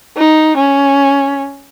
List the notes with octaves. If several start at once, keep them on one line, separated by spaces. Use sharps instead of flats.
D#4
C#4